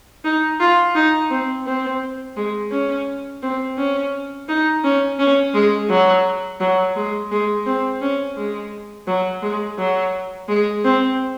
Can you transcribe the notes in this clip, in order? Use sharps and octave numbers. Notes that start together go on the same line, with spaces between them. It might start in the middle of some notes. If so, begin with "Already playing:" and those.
D#4
F4
D#4
C4
C4
G#3
C#4
C4
C#4
D#4
C#4
C#4
G#3
F#3
F#3
G#3
G#3
C4
C#4
G#3
F#3
G#3
F#3
G#3
C4